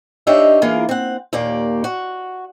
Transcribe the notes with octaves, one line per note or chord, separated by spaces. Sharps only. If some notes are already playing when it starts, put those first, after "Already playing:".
D4 D#4 G4 C5 C#5 E5
E3 A#3 F4 G#4 A#4
C4 F#5
D#2 A#2 A#3 G4 D5
F#4